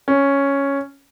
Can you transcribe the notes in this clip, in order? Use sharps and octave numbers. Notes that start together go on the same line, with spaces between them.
C#4